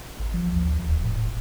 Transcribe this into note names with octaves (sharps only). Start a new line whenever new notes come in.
A1
F3
D#2
D#2
D1
A2
E1